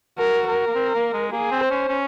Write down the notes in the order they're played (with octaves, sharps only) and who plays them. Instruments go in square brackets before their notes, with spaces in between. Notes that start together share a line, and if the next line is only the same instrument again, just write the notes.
[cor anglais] F#4 [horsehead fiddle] A#4
[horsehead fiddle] A#4
[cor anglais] A#3
C4
A#3
G#3
[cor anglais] A#3 [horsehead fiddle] G#4
[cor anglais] C4
[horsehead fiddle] C5
[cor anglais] C#4
C#4